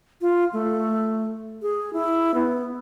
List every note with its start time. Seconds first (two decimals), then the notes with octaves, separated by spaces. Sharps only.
0.21 F4
0.53 A3
1.62 G#4
1.93 E4
2.34 B3